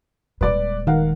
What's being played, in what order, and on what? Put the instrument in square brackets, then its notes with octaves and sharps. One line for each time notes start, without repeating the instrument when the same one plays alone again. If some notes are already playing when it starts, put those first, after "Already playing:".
[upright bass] D#1 G#3 [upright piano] B4 D5 D6
[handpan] D#3 [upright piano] A#4 F5 F#5